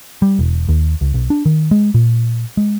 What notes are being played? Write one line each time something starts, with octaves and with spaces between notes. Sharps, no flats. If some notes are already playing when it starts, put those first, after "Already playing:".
G3
E1
D#2
C#2
B1
D4
D#3
G#3
A#2
G#3